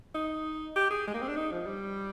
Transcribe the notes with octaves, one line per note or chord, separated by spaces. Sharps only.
D#4
G4
G#4
G#3
A#3
C4
D4
D#4
F3
G3